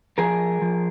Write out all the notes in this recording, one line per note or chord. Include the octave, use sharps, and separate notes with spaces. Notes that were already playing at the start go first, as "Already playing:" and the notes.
F3 G#4 A#4
F3